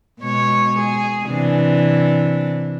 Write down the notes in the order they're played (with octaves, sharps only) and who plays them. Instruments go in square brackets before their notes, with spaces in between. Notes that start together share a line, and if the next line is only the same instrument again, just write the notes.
[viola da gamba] B2 G#3 C#5
G#4
C3 E3 D4